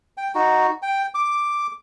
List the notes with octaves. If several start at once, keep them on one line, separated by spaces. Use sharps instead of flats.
G5
D#4 F#4
G5
D6